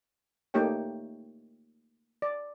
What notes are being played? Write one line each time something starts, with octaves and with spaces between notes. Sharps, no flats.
A3 A#3 D#4 G4 C#5 G5
D5